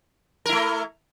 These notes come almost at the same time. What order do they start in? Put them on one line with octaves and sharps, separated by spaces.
A#4 E4 A3